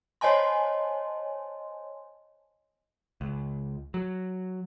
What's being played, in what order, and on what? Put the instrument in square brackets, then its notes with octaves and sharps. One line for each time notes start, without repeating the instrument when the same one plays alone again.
[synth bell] C5 C#5 D#5 G#5 A5 C6
[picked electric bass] C#2
F#3